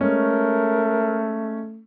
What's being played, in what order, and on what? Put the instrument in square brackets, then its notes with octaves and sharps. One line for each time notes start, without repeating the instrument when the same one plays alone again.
[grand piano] G#3 C#4 [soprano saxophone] A3 [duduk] A#4